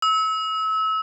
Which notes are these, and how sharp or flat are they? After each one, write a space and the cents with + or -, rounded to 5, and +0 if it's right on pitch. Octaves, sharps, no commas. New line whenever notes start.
E6 -30